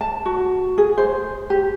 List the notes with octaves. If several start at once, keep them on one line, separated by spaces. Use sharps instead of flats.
A5
F#4
G#4
C5
G4